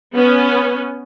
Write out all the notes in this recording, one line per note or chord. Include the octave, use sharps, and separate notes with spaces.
B3 C#4